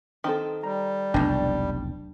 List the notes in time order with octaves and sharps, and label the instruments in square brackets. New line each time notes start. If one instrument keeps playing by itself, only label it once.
[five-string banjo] D#3 C4 A4
[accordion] G3 [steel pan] A#5
[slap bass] F1 B1 E2 [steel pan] D4 G5